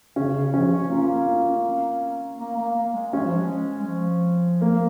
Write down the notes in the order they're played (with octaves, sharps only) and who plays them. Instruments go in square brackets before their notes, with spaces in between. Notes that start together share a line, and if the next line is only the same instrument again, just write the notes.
[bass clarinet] C#3 [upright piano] C#4
[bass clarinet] C#3
[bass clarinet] F3 [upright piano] C#4
[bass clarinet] C#4
[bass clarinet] A#3 [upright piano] F4
[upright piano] C#4
[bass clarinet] A#3
A#3
A#3
G#3
[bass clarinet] G#3 [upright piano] C#4
[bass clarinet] F3
G#3
G#3
F3
[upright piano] A#3